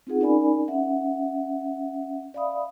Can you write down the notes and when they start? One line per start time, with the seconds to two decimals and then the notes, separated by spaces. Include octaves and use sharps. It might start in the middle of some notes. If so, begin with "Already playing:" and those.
0.07 C4 D#4 F4 G#4 F#5
0.20 C#4 D#4 A#4 D5 G#5 B5
0.68 C#4 E5 F#5
2.34 D5 E5 F5 B5 D#6